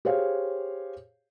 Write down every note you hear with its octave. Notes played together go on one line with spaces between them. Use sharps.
G4 G#4 C5 C#5 F5